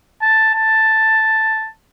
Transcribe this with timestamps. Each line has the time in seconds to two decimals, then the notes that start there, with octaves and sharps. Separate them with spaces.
0.22 A5
0.54 A5